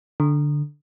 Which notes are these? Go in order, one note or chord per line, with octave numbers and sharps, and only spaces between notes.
D3